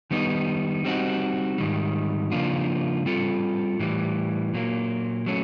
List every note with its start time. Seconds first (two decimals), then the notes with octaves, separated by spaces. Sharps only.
0.11 D#3 G3 B3 D#4
0.85 G3 C4 D#4 F#4
1.58 G#2 D#3 G3
2.32 C#3 F3 A#3 D4 F4
3.06 G3 C4 F4 A4
3.79 A2 E3 G3
4.54 A#2 F#3 A#3
5.26 F#3 A3 C#4